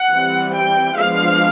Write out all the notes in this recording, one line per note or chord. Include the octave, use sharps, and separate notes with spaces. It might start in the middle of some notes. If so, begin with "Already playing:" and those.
Already playing: F#5
E3 G3 C4
G5
F3 G#3 B3 D4 F5